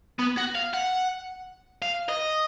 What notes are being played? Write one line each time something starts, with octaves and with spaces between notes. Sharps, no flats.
B3
F#4
F5
F#5
F5
D#5